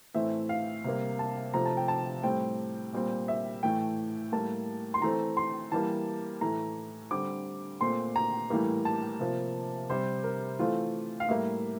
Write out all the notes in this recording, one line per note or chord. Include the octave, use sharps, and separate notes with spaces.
A2 E3 A3 C4 E5
F5
C3 G3 A#3
A5
C3 F3 A3 A#5
A5
G5
A5
A2 G3 C4 G5
A#2 G3 C4
E5
A2 E3 A3 G5
A2 G3 A#3 A5
C6
E3 A3 C4 A#5
C6
E3 G3 A#3 A5
A2 E3 A3 A#5
D3 G3 C4 D6
A#2 A3 C4 C6
A#5
A2 E3 G3 A#3
A5
C3 F3 A#3
C3 G3 C4 C5
A#4
E3 A3 C4 F4
F5
A2 G3 A#3 E5